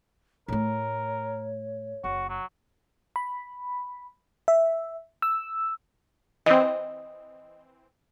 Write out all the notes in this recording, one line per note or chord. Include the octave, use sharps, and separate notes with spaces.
A2 A3 A#4 C#5
F#1 F#4
F#3
B5
E5
E6
E3 C4 D#5